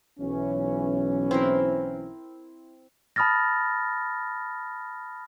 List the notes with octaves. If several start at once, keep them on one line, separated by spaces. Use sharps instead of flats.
B1 E3 C#4
C4 E4 A#4
A5 B5 D#6 F6 A6 A#6